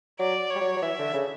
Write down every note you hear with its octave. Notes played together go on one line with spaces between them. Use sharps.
F#3 D5
G3 C#5
F#3
F#3
E3 E5
D3
C#3